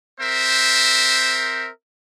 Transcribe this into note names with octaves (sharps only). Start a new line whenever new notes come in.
C4 A#4 C5 E5